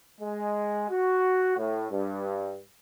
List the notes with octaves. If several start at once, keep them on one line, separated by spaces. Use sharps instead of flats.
G#3
F#4
A2
G2